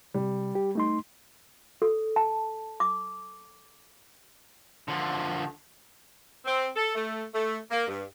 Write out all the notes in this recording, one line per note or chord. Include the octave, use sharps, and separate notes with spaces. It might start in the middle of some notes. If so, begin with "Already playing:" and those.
C3 G3
G4
A3 D#4 C6
A4
A5
D6
D3 F3
C4
A4
A3
A3
A#3
G2